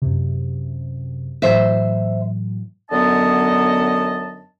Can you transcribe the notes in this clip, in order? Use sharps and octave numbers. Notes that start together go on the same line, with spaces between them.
F#2 C3
A2 E3 F#3 C5 E5
F#2 D3 F#3 B3 D#5 A5